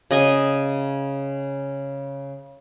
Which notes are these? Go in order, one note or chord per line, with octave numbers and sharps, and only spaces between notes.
C#3 D#5 G#5